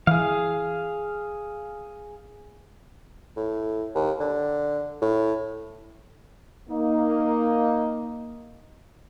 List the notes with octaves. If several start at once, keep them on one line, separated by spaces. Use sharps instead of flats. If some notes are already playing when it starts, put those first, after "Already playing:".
E3 G#4 F5
A2
D#2
D3
A2
A#3 D#4